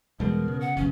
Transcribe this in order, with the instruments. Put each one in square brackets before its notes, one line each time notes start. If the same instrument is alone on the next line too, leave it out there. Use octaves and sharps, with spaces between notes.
[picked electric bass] E2 G3 G#3 [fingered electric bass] B2 [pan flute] A#4
[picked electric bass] C#3
[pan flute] F#5
[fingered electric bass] F#1 B1 [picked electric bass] C#3 [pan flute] C#4